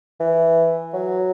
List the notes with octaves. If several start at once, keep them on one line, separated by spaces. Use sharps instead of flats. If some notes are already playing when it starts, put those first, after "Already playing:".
E3
F#3